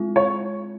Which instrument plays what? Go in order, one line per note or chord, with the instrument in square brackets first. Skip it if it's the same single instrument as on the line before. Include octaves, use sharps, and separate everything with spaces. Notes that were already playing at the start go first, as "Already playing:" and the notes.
Already playing: [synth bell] G#3 C4 F4
[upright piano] C#5